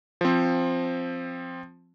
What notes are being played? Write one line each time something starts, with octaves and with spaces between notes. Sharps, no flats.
F3 C4